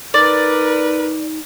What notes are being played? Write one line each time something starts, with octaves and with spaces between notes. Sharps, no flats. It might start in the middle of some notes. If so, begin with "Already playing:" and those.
D#4 A#4 B4 D5